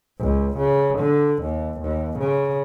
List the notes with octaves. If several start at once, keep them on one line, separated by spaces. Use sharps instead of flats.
C#2
C#3
D3
D#2
D#2
C#3